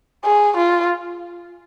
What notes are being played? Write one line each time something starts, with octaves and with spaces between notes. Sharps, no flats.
G#4
F4